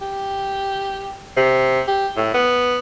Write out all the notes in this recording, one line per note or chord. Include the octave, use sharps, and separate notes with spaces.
G4
C3
G4
A2
B3